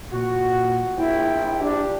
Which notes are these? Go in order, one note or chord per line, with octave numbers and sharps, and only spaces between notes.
A#2 F#4
A#1 E4 G5
D4 G4